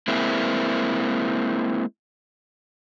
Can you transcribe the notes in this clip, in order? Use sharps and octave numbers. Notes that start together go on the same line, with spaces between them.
G#3 A#3 C4 E4